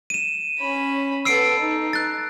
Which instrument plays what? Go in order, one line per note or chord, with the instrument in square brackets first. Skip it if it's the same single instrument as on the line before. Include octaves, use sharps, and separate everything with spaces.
[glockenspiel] D#7 E7
[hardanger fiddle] C#4 B5
[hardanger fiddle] B3 A4 [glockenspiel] E6 C7 D7
[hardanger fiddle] D#4
[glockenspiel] F#6 A6